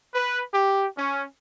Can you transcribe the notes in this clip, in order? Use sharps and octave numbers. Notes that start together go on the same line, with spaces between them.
B4
G4
C#4